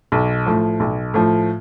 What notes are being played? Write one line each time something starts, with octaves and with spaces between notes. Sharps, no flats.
B1
A2 F3
B1
A2 F3